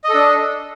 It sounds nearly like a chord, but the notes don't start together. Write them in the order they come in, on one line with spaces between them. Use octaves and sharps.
D#5 A4 D4